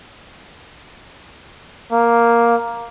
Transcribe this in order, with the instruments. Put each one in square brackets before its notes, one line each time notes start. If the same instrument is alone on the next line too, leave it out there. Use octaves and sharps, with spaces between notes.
[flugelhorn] A#3